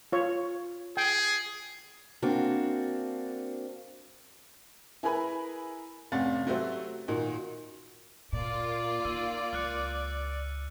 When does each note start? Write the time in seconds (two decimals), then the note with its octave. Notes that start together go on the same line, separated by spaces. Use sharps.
0.12 F4 C#5
0.97 G#4 G5
2.22 A#3 C4 D4 F#4
5.03 E4 G#4 A#4 B4 G#5 B5
6.12 F1 C3 C#4 F5 F#5 A6
6.47 F#3 A3 F#4 G4 C5 E5
7.08 A#2 D#3 D#4 F#4
8.33 A#2 A#3 F4 D5
9.05 D#4 E6 D#7
9.53 C#2 F6 F#6 C#7